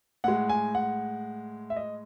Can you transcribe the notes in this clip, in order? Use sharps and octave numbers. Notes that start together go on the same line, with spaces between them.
A2 G#3 F#5
G#5
F#5
E5
D#5